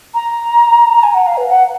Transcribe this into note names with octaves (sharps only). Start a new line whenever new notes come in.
A#5
A#5
G#5
F#5
F5
B4
F#5